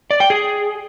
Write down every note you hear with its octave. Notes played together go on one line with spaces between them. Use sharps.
D5
G5
G#4